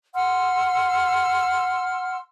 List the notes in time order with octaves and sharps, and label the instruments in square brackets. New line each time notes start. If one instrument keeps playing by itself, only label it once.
[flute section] F#5 C6 E6 F6